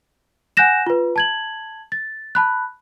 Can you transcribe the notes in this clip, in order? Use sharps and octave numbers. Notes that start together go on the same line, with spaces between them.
F#5 G#5 F#6 G6 A#6 E7
F4 B4
A5 G#6 F#7
A6
A5 B5 F#6